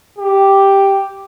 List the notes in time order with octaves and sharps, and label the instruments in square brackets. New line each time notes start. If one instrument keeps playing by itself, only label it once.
[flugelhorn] G4